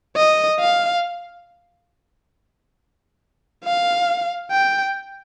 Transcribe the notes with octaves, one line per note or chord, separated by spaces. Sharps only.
D#5
F5
F5
G5